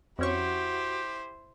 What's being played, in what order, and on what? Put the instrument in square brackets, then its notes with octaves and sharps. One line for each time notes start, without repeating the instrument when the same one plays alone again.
[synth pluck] F2 C#4 C#6 [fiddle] E4 C5 [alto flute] F#4 [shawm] G4